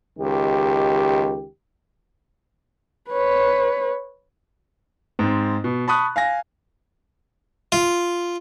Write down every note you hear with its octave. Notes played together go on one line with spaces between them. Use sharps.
C#2 D#3 G4
B4 C#5
G#2 C4
B2
A5 B5 C#6 D#6 F#6
F5 G#5 A#6
F4